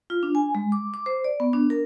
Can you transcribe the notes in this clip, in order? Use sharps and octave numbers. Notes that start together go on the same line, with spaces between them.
F4
D4
G#5
G#3
D6
D6
C5
D5
B3
D4
A#4